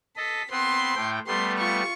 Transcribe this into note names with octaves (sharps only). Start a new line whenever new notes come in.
A4 D#5 B6
B3 C4 B4 C6
A2 A3 G5
G3 A3 B3 C6
F4 C#6